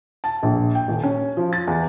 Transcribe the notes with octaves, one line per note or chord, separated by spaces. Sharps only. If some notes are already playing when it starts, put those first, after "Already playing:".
A5
A#1
G5
D#1
C#4
F3
A6
E2